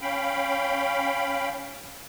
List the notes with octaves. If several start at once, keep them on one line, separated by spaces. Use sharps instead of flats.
C#4 F5 G5 B5